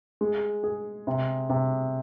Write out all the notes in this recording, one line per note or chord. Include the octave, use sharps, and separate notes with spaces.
G#3
G#4
C3
C3